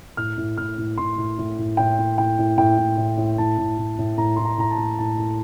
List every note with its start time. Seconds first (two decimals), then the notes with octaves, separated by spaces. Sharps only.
0.17 A2 F6
0.37 A2
0.57 A2 F6
0.78 A2
0.98 A2 C6
1.18 A2
1.38 A2
1.58 A2
1.77 A2 G5
1.98 A2
2.18 A2 G5
2.39 A2
2.57 A2 G5
2.78 A2
2.97 A2
3.17 A2
3.38 A2 A5
3.58 A2
3.78 A2
3.98 A2
4.17 A2 A#5
4.36 A2 C6
4.45 A#5
4.58 A2 A#5
4.71 A5
4.78 A2
4.99 A2 A5
5.18 A2